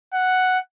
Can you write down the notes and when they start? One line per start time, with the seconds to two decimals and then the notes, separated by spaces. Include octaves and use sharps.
0.14 F#5